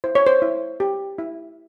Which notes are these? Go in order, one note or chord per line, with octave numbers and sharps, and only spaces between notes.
E4 C5
C#5
C5
E4
G4
E4